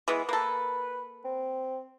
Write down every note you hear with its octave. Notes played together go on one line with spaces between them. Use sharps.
E3 G#3 B3
A#3 A4 B4
C4